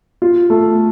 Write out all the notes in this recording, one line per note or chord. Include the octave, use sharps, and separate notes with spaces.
F4
A3